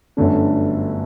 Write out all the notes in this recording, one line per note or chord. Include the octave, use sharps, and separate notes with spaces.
G1 F#2 D3 A3 D4